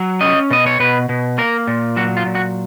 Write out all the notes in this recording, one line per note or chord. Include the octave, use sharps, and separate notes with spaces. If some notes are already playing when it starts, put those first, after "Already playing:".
Already playing: F#3
C#4 D#5
B2 D#5
C#5
B2 B4
B2
A#3 A#4
A#2
F#3 F#4
F4
A#2
F#4